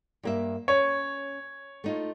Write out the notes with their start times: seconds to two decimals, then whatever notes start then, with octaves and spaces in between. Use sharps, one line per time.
0.23 G2 A#3 E5
0.68 C#4 C#5
1.84 A3 D#4 F4